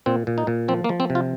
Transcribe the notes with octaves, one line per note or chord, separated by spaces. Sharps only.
A#2 C4
A#2
D#4
A#2
F3 C4
A#3
F3
C4
C3
F4